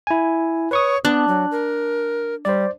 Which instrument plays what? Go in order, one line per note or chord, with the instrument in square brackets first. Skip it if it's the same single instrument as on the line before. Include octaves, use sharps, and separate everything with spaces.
[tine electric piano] E4 G#5
[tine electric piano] B4 C#6 D#6 [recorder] C#5
[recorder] B3 [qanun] D4 [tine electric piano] F#6
[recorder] F#3
A#4
[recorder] G3 [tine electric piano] C5 D5